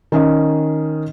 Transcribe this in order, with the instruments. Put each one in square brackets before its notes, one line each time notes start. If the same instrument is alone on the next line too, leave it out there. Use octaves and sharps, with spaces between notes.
[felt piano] D#3 C#4 D#5